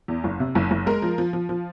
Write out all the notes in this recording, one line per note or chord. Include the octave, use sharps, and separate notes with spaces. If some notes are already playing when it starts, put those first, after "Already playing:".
E2
F#1
C3
F#1
F#1
G#3 A#4
F3
F3
F3
F3